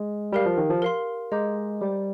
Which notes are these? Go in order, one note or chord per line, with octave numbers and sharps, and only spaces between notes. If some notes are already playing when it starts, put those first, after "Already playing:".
Already playing: G#3
G3 G4 A#4 F5
F3
D#3
F3
A#4 F5 C6
G#3 D#5 A#5 D6 G6
G3 C5 G5 D6